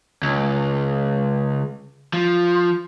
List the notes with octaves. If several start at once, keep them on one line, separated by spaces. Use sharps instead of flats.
C#2
F3